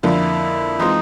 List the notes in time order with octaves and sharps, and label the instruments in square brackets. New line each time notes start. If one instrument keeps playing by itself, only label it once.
[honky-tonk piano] F2 D3 F3 A#3 D4 [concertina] E4
[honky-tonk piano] E3 G#3 C4 F4 [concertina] D#4